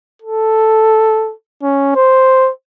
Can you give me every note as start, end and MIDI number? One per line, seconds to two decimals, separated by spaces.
0.22 1.33 69
1.63 1.92 61
1.96 2.50 72